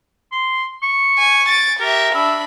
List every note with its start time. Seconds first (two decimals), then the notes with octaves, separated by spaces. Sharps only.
0.32 C6
0.82 C#6
1.19 G#5
1.49 A6 D7
1.80 G4 A#4 E5
2.14 D4 E5 B5